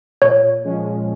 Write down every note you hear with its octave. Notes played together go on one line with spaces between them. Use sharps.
A#2 C#5
F3 G#3 C#4